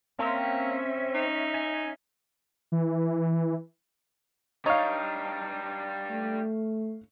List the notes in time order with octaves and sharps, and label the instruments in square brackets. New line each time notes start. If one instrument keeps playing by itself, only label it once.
[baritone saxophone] A#3 [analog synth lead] C4 [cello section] C#4 E5
[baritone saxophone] D#4
[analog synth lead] G#5
[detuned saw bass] E3
[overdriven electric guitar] G3 D4 [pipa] D#4 [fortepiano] C#5 F5
[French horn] A3